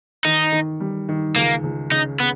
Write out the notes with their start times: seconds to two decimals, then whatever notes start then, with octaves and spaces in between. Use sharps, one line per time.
0.25 D#3 D#4
0.52 D#3
0.80 G3
1.09 D#3
1.35 C#2 A#3
1.63 C#2
1.92 C#3 D#4
2.20 C#3 B3